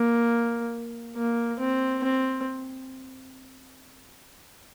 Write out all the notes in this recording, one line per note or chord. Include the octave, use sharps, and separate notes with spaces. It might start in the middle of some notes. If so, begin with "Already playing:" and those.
Already playing: A#3
A#3
C4
C4